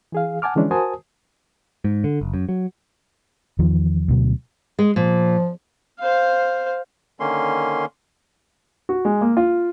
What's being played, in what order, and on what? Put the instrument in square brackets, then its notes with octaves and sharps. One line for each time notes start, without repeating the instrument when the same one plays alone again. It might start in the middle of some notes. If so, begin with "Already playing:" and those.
[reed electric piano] E3 G#4 F5
F#5 G#5 A5 D6 F6
D3 E3 F3 G#3 C#4 D4
F#4 A#4 C5 G#5 A5 D#6
[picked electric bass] G#2
D3
F#1
F#2
F#3
[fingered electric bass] E2 D#3 F3
D2 B2 F#3
[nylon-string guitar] G#3
[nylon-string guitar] A#2 [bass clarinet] F3
[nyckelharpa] C5 F5
[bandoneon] D3 D#3 A#3 C#4 C6
[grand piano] F#4
G#3
A#3
F4